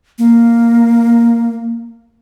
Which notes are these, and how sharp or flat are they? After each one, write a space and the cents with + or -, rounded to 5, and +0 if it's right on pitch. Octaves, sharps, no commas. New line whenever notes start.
A#3 +0